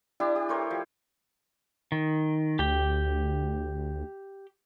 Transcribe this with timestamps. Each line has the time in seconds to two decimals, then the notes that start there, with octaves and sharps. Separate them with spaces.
0.20 D4 E4 G4 A5
0.36 G4
0.49 A3 A#4 C5 C#5
0.71 F3
1.92 D#3
2.59 D2 G4 G5